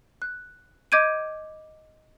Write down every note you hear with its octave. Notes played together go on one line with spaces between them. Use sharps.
F#6
D#5 D6 G6 G#6 D7 D#7